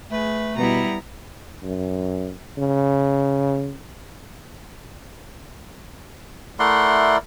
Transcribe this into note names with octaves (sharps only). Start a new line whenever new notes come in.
A3 G#4 B4
B2 G3 B3 E4 A#5
F#2
C#3
A3 E4 A#4 D5 F#5 C6